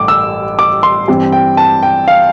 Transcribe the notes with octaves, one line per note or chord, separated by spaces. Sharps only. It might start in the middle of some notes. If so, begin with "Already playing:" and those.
Already playing: A1 G2 D3 D6
E6
D6
C6
G2 E3 G3 C4
G5
A5
G5
F5